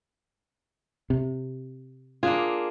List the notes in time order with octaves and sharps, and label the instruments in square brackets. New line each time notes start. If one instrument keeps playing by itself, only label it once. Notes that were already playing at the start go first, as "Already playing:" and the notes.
[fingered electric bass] C3
[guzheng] A#3 D4 G#4 [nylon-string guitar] F4